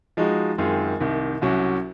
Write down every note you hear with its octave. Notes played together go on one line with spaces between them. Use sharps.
F3 G#3 D#4 F#4
F#2 D#3 G#3 C4 F4
C2 C3 D#3
C2 C3 F#3 C#4 F#4